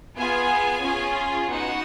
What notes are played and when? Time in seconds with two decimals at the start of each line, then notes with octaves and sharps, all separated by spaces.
0.16 B3 F4 G#4 G#5
0.81 C#4 F4 G#4
1.47 B3 D#4 F#4 F#5